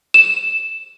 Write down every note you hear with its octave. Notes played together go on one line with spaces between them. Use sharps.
E7